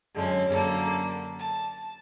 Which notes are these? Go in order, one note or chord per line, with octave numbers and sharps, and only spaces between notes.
F#2 D3 G#3 C#4
F#2 D3 A#3 A4
A5